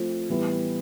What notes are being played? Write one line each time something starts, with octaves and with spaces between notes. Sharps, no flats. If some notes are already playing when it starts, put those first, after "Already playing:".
Already playing: F3 A3 C4 F4
A2 E3 G3 B3 E4